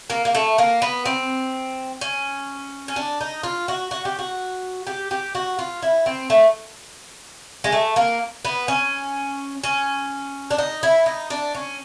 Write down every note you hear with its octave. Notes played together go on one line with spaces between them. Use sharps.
A#3
A#3
A3
A#3
B3
C4
C#4
C#4
D4
D#4
F4
F#4
F#4
G4
F#4
G4
G4
F#4
F4
E4
C4
A3
G#3
A3
A#3
B3
C#4
C#4
D4
D#4
E4
D#4
D4
C#4